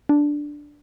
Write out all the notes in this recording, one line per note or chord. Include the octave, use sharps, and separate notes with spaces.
D4